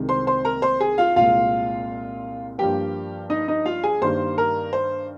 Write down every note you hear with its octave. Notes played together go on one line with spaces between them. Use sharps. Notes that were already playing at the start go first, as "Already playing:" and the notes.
Already playing: C2 C3 D#3 G#3
C5 C6
C5 C6
A#4 A#5
C5 C6
G#4 G#5
F4 F5
C2 A#2 G#3 F4 F5
G2 F3 A#3 G4 G5
D#4 D#5
D#4 D#5
F4 F5
G#4 G#5
G2 D#3 G3 A#3 C5 C6
A#4 A#5
C5